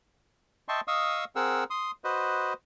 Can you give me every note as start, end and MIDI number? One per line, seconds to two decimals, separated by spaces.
0.68 0.81 75
0.68 0.81 76
0.68 0.81 79
0.68 0.81 81
0.68 0.81 84
0.68 0.81 85
0.88 1.25 75
0.88 1.25 77
0.88 1.25 85
0.88 1.25 87
0.88 1.25 88
1.36 1.64 60
1.36 1.64 68
1.36 1.64 70
1.36 1.64 78
1.36 1.64 88
1.70 1.91 84
1.70 1.91 87
2.04 2.53 66
2.04 2.53 71
2.04 2.53 72
2.04 2.53 75